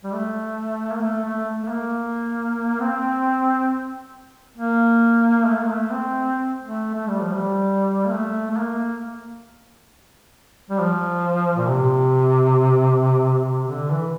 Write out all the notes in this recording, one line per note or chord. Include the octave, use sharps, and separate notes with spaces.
G3
A3
A#3
A3
A3
A3
A#3
C4
A#3
A3
A#3
A3
C4
A3
A3
G3
F3
G3
A#3
A3
A3
A#3
G3
F3
A#2
C3
C3
D3
E3